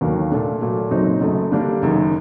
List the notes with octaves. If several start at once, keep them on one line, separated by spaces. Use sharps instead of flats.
D#2 D3 F#3 A#3
A#2 A3 D4 A4
A#2 F#3 A3
F#1 F#2 F#3 C4 D#4
F#1 F#2 F#3 A3
D3 G3 A#3 D4
F#1 F#2 D#3